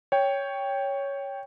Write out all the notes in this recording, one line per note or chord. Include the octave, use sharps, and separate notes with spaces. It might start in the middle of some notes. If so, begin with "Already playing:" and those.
C#5 G5